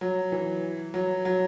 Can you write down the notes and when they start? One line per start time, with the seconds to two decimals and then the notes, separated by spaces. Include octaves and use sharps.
0.01 F#3
0.32 E3
0.94 F#3
1.25 F#3